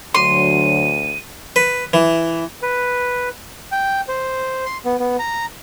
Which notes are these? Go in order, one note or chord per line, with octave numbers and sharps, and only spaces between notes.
D2 D3 F#3 C6 D#7
B4
E3
B4
G5
C5
C6
B3
B3
A#5